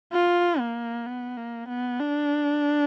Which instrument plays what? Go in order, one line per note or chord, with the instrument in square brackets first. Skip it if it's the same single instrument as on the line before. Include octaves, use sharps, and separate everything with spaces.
[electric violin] F4
A#3
B3
A#3
B3
D4